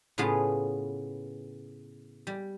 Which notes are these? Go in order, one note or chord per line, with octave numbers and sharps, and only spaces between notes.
A2 C#3 B3 F4 G#4 A5
G3